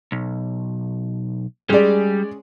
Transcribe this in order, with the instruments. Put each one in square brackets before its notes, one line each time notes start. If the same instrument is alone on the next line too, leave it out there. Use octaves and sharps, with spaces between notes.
[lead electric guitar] B1
[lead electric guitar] G3 [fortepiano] G#3 D5 [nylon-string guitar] C#4 G#4